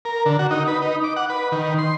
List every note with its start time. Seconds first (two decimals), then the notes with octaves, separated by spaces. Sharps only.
0.05 A#4
0.26 D3
0.39 F#4
0.51 D#4
0.68 B4
0.82 D#4
1.04 D6
1.16 F#5
1.30 B4
1.52 D#3
1.78 C6